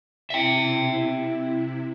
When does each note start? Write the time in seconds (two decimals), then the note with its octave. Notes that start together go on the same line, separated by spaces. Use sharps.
0.30 C3 E4 E5 G5